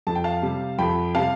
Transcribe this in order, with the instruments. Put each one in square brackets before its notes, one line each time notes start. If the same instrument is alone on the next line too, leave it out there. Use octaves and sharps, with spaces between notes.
[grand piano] F2 A5
G5
F5 A5
C3 G3
F2 G5 B5
C3 G3 F5 A5